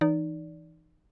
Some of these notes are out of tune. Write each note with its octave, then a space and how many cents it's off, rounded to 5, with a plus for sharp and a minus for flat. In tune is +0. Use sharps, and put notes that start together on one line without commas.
E3 +0 D#4 -15 D5 -20